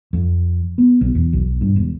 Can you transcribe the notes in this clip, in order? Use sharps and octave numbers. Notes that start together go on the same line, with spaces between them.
F2
B3
B1
E2
B1
G2
E1